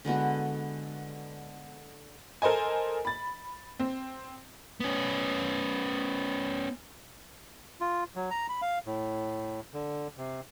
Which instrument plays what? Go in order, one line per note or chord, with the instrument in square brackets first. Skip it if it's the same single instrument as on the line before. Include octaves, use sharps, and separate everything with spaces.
[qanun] D3 G#3 B3 F#4
[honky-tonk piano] A4 A#4 C5 D#5 G#5
B5 A6
C4
[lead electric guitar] B3 C#4
[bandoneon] F4
F#3
A#5
B5
F5
A2
D3
C3